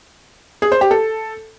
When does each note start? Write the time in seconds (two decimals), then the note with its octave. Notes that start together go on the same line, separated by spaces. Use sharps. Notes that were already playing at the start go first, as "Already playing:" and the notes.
0.62 G#4
0.72 C5
0.81 G4
0.91 A4